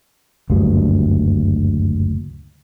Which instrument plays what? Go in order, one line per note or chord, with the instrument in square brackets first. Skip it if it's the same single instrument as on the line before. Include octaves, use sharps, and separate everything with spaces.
[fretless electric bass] F#1 D2 G2